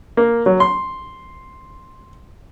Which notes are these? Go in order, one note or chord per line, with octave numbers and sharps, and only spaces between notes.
A#3
F#3
C6